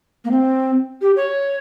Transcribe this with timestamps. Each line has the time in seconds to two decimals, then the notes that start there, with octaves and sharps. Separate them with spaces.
0.25 A#3
0.31 C4
1.02 G4
1.16 C#5